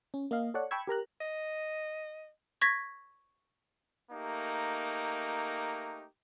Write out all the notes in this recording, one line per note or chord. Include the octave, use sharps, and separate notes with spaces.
C#4
A#3 D#5 F5
A4 C#5 D5 F#5
G5 A5 B5 C#6 E6 G#6
G4 A#4 A#5 F#6
D#5
C#6 G#6 A#6 B6
A3 A#3 D#4 G4